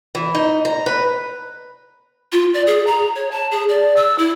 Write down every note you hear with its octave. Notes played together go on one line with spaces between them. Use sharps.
E3
D#4
A#5
B4
F4
D5
G#4
A#5
C#5
A5
G#4
D5
E6
E4